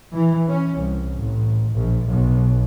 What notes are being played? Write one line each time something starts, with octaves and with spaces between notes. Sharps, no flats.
E3
C#4
C2
A1
A#1
B1